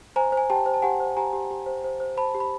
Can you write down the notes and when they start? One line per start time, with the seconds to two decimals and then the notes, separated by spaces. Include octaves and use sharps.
0.16 C5 G#5 A#5
0.32 C5
0.37 G#5
0.50 G4 G5 A5
0.66 C5
0.74 A5
0.82 G4 F#5 G#5
1.00 C5
1.17 G4 G#5 A#5
1.33 G4
1.51 G4
1.66 C5
1.84 C5
2.00 C5
2.17 C5 A5 B5
2.35 G4
2.40 B5